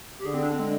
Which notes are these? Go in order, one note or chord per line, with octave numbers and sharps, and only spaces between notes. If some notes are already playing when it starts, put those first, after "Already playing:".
G4
D3 G#4
C4
D4
C4
G#3